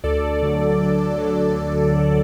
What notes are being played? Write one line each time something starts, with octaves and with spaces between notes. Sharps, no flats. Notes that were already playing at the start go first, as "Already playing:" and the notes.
D2 A4 D5
D3 F#3
D2
D3 F#3